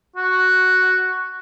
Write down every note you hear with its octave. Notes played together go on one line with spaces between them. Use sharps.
F#4